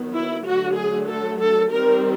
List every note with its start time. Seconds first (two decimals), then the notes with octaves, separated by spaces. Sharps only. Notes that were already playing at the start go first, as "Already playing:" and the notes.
Already playing: D#3 F#3 B3
0.15 E4
0.46 D3 F#3 A3 F#4
0.78 G#4
1.09 A4
1.40 A4
1.71 D#3 G3 C4 A#4